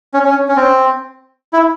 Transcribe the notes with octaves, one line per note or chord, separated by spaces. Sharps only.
C#4
C#4
C#4
C4
E4